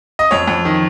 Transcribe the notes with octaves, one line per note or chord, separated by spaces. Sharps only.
D#5
F2 C#5
F2
D#3